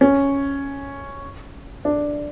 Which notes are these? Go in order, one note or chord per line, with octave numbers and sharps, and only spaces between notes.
C#4
D4